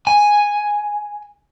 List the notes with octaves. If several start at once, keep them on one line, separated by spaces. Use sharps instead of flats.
G#5